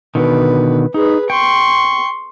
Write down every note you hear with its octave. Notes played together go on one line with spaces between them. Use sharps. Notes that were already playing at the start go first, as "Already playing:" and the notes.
B2 D3 D#3 B4
D#4 G#4 B4
G5 C6 C#6